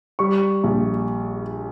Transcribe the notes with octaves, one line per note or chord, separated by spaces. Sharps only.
G3 C#6
A#1